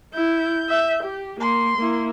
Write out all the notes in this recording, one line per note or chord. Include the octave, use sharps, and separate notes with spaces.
E4 G6
E5
G4
A#3 C6
A#3 E4